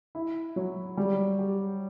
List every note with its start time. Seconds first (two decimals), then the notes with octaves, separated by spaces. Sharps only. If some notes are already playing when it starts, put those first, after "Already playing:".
0.15 E4
0.56 F#3
0.97 G3
1.39 G4